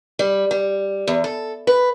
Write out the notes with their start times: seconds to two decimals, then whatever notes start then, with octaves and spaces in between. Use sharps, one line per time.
0.19 G3
0.51 G3
1.07 E2
1.24 A4
1.67 B4